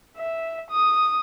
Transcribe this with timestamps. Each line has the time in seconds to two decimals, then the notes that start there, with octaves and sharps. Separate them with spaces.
0.17 E5
0.70 D#6